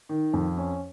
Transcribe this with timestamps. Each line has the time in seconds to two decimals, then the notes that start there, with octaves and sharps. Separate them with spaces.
0.09 D#3
0.34 F2
0.58 C#4